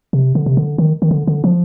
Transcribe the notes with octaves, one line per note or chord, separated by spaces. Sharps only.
C3
D3
C3
D3
D#3
D#3
D3
D3
F3